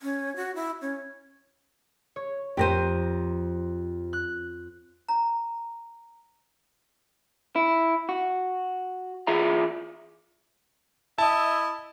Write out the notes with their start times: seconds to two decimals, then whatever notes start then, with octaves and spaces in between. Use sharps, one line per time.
0.02 C#4
0.36 F#4
0.55 E4
0.81 C#4
2.16 C#5
2.57 F2 G4 A#4 C5 A#6 D#7
4.13 F#6
5.09 A#5
7.56 E4
8.09 F#4
9.27 E3 F4 G#4 E5 A#5
11.18 E4 D#5 E5 A5